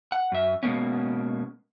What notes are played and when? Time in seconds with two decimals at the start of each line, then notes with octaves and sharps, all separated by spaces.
0.12 F#5
0.32 F#2 E5
0.63 B2 G#3 A#3 B3 C#4